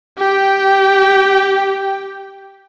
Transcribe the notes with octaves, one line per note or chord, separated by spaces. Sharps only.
G4 G5